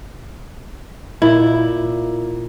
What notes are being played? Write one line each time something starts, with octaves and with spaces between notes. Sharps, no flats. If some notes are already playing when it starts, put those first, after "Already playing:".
A#2 E4